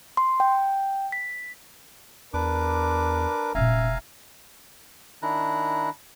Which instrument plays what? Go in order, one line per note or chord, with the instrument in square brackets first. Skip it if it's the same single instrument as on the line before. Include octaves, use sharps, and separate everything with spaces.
[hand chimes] C6
G5
B6
[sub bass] E2 [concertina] D4 B4 D6 [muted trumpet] A#4
[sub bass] F1 [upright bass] A#2 C#4 [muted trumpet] E5 [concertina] F5 G#5 A#5
[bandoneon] D#3 D4 E4 A#5 F#6